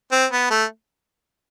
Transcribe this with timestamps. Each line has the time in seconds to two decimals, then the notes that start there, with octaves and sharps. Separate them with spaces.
0.12 C4
0.32 B3
0.51 A3